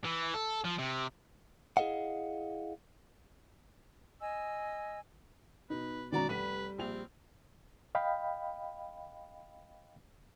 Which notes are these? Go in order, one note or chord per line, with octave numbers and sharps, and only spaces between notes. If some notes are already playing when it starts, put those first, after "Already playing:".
E3
A4
F3
C3
E4 G#4 A4 D#5 F5 F#5
D#5 G#5 E6
B2 D#4 B4
B2 D#3 G#3 C#4 D#4 F#4 D5 A#5
F1 G3 B4 B6 D#7
A#1 C4 F7
D#5 F5 G5 B5